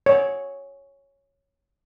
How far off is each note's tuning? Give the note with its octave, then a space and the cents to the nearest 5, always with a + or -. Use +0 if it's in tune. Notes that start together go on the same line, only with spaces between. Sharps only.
C#5 +0